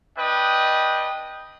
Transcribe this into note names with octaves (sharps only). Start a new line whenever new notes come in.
D4 B4 D#5 G5